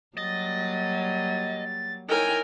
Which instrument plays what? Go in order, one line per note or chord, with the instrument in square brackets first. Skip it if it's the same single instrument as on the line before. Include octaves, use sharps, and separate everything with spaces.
[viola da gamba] F#3 G3 A#3 [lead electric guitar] D#5 [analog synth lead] A6
[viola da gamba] D#4 E4 C#5 [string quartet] A#4 G5 G#5